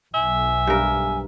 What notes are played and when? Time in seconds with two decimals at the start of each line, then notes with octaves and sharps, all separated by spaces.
0.14 B1 E5 G#5
0.67 G2 A#4